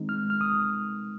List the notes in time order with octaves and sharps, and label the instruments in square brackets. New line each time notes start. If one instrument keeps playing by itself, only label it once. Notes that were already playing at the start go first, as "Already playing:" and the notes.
Already playing: [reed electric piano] D#3 G#3 C4 D#4
F6
F6
D#6